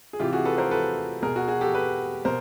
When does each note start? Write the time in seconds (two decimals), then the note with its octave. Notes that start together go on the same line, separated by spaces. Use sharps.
0.13 G#4
0.19 C3 E3 F4 G4
0.33 F#4 G#4
0.45 A4 B4
0.58 A#4 C5
0.71 A4 B4
1.22 B2 G#4 A#4
1.36 F#4 G#4
1.48 F#4 G#4
1.61 G4 A4
1.73 A4 B4
2.25 B2 A#4 C5